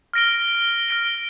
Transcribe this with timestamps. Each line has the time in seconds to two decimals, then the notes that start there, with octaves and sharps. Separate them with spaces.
0.13 F6 A#6 D7 G7
0.88 F6 A#6 D7 G7